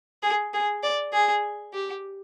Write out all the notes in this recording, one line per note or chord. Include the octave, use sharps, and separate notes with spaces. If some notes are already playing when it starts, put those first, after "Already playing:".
G#4
G#4
D5
G#4
G4